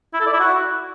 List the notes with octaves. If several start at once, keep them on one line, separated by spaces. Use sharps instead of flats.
E4
A4
D5
E4
F#4